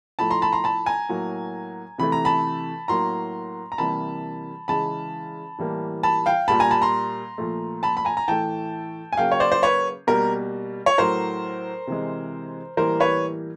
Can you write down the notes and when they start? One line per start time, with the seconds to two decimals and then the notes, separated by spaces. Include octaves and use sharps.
0.19 A2 F3 A3 A5 B5
0.30 A#5 C6
0.42 A5 B5
0.52 A#5 C6
0.64 A5 B5
0.86 G#5 A#5
1.09 A2 F#3 A#3
1.98 C3 E3 A3 B5
2.12 A#5
2.25 A5 B5
2.88 A2 F#3 A#3 A#5 C6
3.72 A#5
3.78 C3 E3 G3 A#3 A5 B5
4.68 C#3 E3 G#3 A5 B5
5.58 A2 E3 G3 A#3
6.03 A5 B5
6.26 F5 G5
6.48 A#2 G3 A#3 A5 B5
6.60 G#5 A#5
6.71 A5 B5
6.82 A#5 C6
7.38 A#2 F3 A3
7.83 A5 B5
7.97 B5
8.05 G#5 A#5
8.17 A#5
8.28 A2 E3 A3 G5 A5
9.13 G#5
9.17 C#3 F#3 A#3 F5 G5
9.32 C#5
9.40 C5 D5
9.52 C5
9.63 B4 C#5
10.07 B2 G3 A#3 A#4
10.86 C#5
10.98 A2 F#3 A3 A#4 C5
11.87 C3 E3 G#3
12.77 A2 E3 G3 A#3 A#4 C5
13.00 B4 C#5